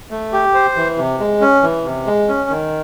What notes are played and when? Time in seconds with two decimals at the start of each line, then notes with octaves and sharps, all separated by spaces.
0.11 A3
0.33 G4
0.54 C5
0.76 E3
0.98 C3
1.20 G#3
1.41 C#4
1.63 E3
1.85 C3
2.06 G#3
2.28 C#4
2.49 D#3